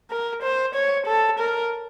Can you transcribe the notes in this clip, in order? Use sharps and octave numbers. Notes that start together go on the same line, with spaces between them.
A#4
C5
C#5
A4
A#4